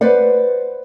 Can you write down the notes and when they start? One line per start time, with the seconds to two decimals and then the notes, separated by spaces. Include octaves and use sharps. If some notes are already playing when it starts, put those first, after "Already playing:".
0.01 B4 C5 D5 F#5